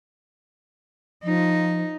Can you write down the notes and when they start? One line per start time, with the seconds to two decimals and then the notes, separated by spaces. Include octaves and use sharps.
1.24 F3 D#4